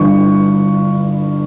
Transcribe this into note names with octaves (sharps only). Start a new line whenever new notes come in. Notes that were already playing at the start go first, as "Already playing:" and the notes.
Already playing: G1 G2 E3 C#6